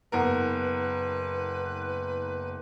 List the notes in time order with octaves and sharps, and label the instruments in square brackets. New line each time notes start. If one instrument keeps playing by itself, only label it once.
[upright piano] F#1 B3 A#4 [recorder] B4